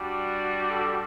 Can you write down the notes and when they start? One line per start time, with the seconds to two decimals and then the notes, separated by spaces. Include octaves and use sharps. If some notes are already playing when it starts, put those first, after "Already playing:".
Already playing: G3 D4 F#4
0.67 A4